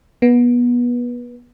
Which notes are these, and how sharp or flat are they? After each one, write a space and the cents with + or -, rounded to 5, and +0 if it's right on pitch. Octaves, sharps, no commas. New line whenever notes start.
B3 -25